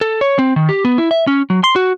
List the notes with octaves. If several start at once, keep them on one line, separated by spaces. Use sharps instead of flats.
A4
C#5
C4
D#3
G4
B3
E4
E5
C#4
F#3
C6
F#4